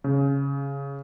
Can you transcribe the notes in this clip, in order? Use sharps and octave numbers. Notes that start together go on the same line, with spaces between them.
C#3